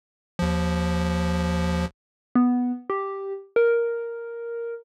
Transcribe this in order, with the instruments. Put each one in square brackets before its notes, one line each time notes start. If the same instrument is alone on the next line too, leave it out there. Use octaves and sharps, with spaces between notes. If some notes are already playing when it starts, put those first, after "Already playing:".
[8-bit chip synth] D#2 F3
[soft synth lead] B3
G4
A#4